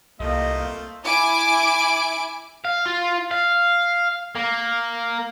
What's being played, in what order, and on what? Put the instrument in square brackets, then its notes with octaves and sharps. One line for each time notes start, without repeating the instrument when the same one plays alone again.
[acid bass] C2 [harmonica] A3 C4 F4 [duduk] A#3 [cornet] D#5
[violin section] E4 G#5 D6 D7
[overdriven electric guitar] F5
F4
F5
A#3